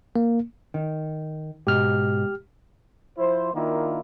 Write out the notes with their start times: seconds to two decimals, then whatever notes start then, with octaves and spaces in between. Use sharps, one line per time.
0.16 A#3
0.74 D#3
1.67 G#2 B2 G4 F6
3.18 F3 E4 C5
3.54 D#3 A#3 D4 E4 F4